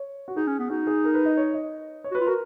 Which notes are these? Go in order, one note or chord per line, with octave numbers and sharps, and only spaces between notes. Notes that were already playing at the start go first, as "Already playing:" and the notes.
Already playing: C#5
F#4
D#4 G#4
C#4
B3
D#4 F#4
G#4
A#4
B4
D#5
C#5
D#5
C#5
F#4
B4
F4
F#4 A#4